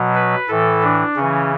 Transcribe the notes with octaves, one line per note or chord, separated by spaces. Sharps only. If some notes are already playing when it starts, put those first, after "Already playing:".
Already playing: B2 F#3
B4
A2 E3 A4
D4
C#3 E3 C#4